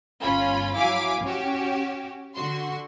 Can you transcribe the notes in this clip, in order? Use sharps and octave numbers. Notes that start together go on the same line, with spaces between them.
G1 C#4 F4 B5
F#3 E4 F5 G#5 D6 B6
C#4 F#4 G4
D3 F#4 C6